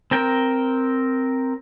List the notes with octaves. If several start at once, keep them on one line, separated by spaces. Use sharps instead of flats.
C4 A#4 G5